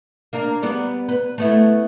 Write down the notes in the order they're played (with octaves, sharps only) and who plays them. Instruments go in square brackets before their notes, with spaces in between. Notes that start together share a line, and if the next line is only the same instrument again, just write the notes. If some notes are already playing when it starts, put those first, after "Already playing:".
[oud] A#3 D4 A#4
G3 B3 D5
B4
A3 B3 E4